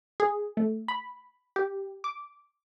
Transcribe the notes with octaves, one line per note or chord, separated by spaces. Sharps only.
G#4
A3
B5
G4
D6